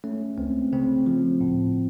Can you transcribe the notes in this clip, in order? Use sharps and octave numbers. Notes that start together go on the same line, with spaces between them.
A3 C#4
C#2 C4
C#3 C4
F3
A2